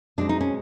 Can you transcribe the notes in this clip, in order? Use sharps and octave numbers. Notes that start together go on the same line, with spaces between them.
B2 G#3 C4 D4
D#4
C#4